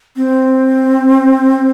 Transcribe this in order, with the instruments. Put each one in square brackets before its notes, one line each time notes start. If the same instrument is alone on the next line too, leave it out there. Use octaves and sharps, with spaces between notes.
[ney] C4